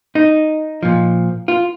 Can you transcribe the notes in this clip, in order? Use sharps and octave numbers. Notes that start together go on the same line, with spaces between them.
D#4
A#2 F3
F4